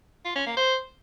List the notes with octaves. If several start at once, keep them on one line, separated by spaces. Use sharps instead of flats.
F4
C#4
A#3
C5